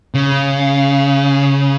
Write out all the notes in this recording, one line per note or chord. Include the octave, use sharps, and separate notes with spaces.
C#3